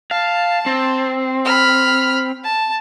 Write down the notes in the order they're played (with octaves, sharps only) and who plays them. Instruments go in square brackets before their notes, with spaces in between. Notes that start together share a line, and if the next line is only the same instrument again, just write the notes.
[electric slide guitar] F5 [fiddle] A5
[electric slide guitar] C4
[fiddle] B5 F6
A5